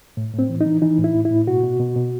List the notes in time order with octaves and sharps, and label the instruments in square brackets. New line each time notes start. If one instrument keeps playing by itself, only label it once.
[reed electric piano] A2
A2 C4
E3
D#4
E3
E3 D#4
A2
E4
A2
E4
A2
B2 F#4
B2
B2
B2